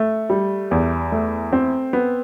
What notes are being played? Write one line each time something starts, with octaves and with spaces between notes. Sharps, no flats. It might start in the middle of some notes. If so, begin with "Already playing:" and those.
Already playing: A3
G3
E2
A3
C4
B3